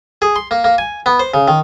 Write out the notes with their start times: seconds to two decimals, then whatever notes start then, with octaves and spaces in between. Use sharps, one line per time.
0.22 G#4
0.36 C6
0.51 A#3
0.64 A#3
0.78 G#5
1.06 B3
1.19 C5
1.34 C#3
1.48 D#3